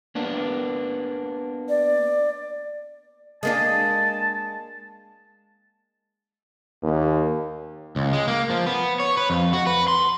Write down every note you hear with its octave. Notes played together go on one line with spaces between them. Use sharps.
A#3 B3 D4
D5
G#3 A#3 D4 A5
D#2
C#2
G#3
A#3
F3
B3
C#5
B4
F2
F#4
B4
C6